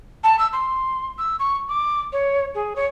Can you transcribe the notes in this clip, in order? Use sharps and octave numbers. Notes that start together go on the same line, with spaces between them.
A5
E6
C6
E6
C#6
D6
C#5
G#4
C#5